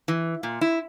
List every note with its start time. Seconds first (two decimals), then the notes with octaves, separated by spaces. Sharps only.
0.08 E3
0.43 A#2
0.61 E4